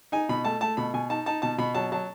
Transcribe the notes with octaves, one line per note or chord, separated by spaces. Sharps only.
D#4 G#5
B2 B5
A3 A5
A3 A5
B2 B5
B2 G#5
D#4 A5
D#4 A5
B2 A5
B2 B5
F#3 A5
F#3 A5